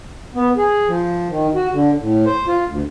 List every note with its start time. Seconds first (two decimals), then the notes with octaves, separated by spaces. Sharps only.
0.35 B3
0.57 G#4
0.88 F3
1.29 D#3
1.55 F#4
1.72 D3
2.00 A2
2.26 C5
2.47 F4
2.67 D2